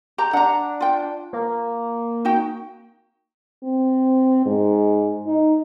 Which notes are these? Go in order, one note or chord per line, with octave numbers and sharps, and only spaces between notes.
G4 A#5
D4 F#5 A#5
F4 G5
A#3
D#4 F#4 G5
C4
G#2
D#4